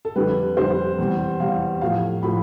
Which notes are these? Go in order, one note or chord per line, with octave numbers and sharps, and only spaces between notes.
A4
F2 D3 G3 B4
F2 D3 G3 C5
E2 C3 G3
E2 C3 G3 F5
A2 F3 A3 F5
A2 F3 A3 B5